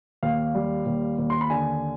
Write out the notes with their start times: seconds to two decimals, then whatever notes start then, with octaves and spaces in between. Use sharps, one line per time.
0.23 D#2 F5
0.55 G3
0.86 D#2
1.19 D#2
1.30 C6
1.41 B5
1.50 D3 G#5